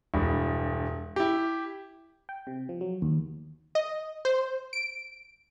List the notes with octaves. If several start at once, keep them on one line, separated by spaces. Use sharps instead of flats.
E1 G2
E4 G4
G5
C3
F3
F#3
D#2
D#5
C5
D7